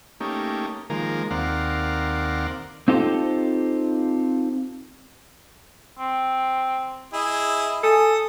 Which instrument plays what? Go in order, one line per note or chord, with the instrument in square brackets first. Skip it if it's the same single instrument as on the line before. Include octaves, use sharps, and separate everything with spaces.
[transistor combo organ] A3 A#3 C#4 D#4 G4
D#3 F3 G#3 A#3 A#4
D#2 C4 A#4 D5 F5 F#5
[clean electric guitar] C4 D#4 F4 G4 A4 C5
[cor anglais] C4
[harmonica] E4 G#4 [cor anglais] D#5
[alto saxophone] A4 [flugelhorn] G#5 [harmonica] D#6